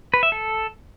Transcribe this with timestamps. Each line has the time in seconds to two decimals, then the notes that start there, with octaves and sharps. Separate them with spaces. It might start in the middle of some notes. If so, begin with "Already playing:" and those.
0.14 B4
0.23 E5
0.32 A4